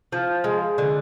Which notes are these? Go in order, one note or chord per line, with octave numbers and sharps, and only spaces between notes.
F3
G#3
D3